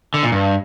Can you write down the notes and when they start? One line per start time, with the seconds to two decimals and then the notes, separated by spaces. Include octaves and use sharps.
0.14 D3
0.23 A#2
0.32 G2